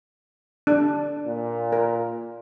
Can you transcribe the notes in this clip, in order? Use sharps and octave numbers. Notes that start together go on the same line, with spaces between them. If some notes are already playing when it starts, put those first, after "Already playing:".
D4
A#2
A#4